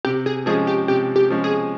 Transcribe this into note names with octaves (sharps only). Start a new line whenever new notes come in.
C3 G4
G#4
F3 G#3 C#4 G#4
G4
C3 G4
G4
F3 G#3 C#4
G#4